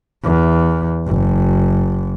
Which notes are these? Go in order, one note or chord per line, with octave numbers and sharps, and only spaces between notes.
E2
F#1